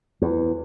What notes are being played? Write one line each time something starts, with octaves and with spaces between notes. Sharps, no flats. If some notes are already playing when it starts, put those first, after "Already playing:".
E2